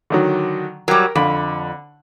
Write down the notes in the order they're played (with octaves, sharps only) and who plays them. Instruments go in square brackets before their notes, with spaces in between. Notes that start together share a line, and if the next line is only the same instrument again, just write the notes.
[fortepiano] D3 D#3 F#3
[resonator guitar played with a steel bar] F#3 G3 [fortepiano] A#4 G5
[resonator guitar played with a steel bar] F2 [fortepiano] D3 B5